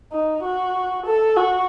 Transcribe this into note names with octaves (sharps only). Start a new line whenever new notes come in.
D#4
F#4
A4
F#4